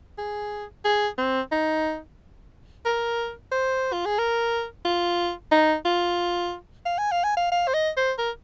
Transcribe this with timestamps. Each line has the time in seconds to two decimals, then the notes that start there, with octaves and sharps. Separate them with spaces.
0.18 G#4
0.85 G#4
1.18 C4
1.52 D#4
2.85 A#4
3.52 C5
3.93 F4
4.06 G#4
4.19 A#4
4.85 F4
5.52 D#4
5.85 F4
6.86 F5
6.98 G#5
7.12 F5
7.24 G#5
7.37 F5
7.52 F5
7.68 C5
7.74 D#5
7.97 C5
8.19 A#4